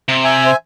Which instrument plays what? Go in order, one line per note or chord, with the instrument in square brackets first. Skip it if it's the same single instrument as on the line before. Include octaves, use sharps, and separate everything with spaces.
[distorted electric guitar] C3
[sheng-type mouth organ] E5 G#5
C5